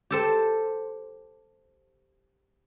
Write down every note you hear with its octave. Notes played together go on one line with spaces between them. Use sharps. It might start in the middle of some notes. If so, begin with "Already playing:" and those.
G4 A4 C5